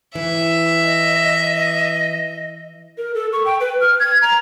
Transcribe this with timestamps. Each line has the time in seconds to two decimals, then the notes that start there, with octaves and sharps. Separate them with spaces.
0.15 E3 E5
0.84 D#5
2.98 A#4
3.15 A4
3.33 C#6
3.45 G5
3.60 B4
3.81 F6
4.00 G#6
4.22 A#5